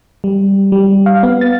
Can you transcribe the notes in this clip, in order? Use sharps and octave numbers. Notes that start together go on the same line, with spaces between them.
G3
G3
F5
B3
A6